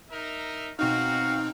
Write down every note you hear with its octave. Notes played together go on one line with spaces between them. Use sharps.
D#4 A#4 E5
B2 C4 D#4 F#4 F5